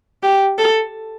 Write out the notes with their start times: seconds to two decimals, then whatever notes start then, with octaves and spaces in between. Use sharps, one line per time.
0.23 G4
0.58 A4